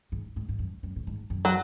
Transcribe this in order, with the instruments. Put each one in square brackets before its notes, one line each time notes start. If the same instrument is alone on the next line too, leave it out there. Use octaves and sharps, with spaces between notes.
[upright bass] G#2
G#2
G#2
F#2
F#2
A2
G#2
F#2
[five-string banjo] F#3